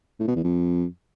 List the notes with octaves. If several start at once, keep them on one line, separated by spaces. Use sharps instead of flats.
A2
B2
E2
F2